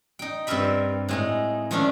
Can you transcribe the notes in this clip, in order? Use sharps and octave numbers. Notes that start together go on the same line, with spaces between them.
D#4 G5
G2 C4 F4 A#4 E5 B5
A2 G#3 D#4
D#3 F3 G#3 A3 C#4 D4